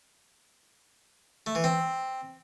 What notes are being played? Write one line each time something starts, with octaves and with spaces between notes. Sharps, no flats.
A3
E3
C4